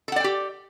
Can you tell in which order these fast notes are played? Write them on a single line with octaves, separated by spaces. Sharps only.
A4 F#5 D5 G5 G4